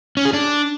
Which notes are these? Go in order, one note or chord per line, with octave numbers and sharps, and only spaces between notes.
C#4
G#4
D4